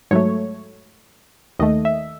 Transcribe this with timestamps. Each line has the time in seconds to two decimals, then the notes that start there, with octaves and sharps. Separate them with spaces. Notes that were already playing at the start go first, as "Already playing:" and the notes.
0.11 G#2 F#3 A3 C#5
1.59 D#2 D#3 A3 D#5
1.85 E5